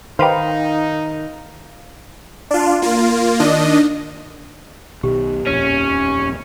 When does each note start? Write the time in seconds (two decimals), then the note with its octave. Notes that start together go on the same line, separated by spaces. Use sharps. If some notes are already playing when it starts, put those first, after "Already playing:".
0.19 D#3 D#4 G4 B4 C5 F5
2.51 D4 F4
2.82 A#3 F4
3.40 D#3 D4 D#5
5.03 B1 B2 D#3 G4
5.47 D#1 A#1 F2 C#4